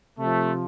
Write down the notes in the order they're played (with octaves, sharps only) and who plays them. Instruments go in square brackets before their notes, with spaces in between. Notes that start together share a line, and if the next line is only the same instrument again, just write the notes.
[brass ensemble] C3 F3 A3